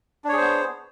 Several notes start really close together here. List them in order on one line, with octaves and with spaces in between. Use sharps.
D4 C#5 G#4 C5 B3